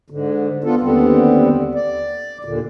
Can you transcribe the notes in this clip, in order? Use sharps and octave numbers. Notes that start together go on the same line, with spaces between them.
G#2 D3
B3 D4 F4 A4
D#2 D3 G3 B3 C4
D5
D#2 A#2 D3